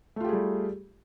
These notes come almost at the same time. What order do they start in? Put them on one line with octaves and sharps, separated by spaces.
A3 F4 G4 G#4 G3